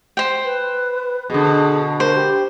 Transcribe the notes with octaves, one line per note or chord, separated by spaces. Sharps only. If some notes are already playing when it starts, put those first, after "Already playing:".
C5 G5
B4
B2 D3 G#4
A#4 C5
G4